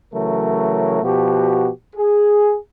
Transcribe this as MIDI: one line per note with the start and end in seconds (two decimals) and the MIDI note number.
0.14 1.00 49
0.14 1.00 52
0.14 1.00 54
0.14 1.00 57
0.14 1.00 70
1.02 1.69 47
1.02 1.69 53
1.02 1.69 66
1.02 1.69 67
1.96 2.55 68